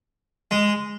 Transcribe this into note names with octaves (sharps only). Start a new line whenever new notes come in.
G#3